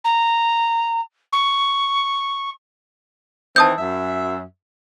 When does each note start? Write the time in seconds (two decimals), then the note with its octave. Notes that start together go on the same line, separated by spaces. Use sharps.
0.04 A#5
1.32 C#6
3.56 D#3 E3 C4 A5 D#6 G6
3.78 F#2 E5